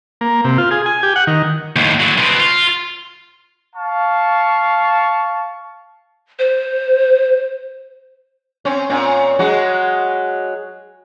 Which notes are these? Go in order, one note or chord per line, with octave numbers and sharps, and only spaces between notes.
A#3
C3
F4
G#4
G#5
G4
F#5
D#3
D#2 A2
D3 F#3
B2 C4
F4
F5 A5 C#6
C5
C4 C#4
A#2 C4 C#4
F#3 G#3 F#4